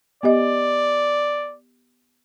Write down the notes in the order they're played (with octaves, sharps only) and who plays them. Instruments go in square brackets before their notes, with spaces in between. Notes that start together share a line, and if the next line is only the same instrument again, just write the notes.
[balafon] B3 G4 D#5 [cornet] D5